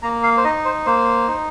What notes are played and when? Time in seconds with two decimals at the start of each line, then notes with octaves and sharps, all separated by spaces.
0.03 A#3 A#5
0.23 F5
0.37 C5
0.44 D#4 D#5
0.65 C5
0.86 A#3 C5
1.28 D#4